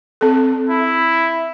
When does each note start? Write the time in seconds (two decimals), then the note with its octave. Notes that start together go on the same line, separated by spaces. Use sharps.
0.21 C4 A4
0.70 E4